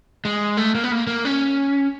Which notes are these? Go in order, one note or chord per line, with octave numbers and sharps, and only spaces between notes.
G#3
A3
A#3
B3
A#3
A#3
C#4